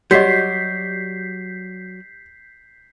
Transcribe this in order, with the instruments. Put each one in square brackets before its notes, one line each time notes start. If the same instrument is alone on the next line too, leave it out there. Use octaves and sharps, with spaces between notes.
[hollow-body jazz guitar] F#3 [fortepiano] G3 [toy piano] F#4 G4 D#5 [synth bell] G6 B6 C7